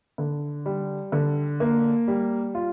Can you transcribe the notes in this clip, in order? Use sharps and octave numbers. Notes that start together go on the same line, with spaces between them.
D3
G3
D3
A#3
G3
F4